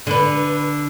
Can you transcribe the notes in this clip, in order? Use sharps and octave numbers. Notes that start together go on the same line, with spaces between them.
D3 B4